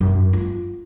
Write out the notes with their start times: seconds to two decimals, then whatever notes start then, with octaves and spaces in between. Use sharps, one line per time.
0.01 F#2
0.33 F4